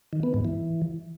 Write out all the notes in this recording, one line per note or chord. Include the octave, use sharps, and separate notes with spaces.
D#3
B3
G#2
E3